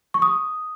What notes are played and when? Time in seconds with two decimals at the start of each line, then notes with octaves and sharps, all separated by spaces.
0.14 C#6
0.22 D#6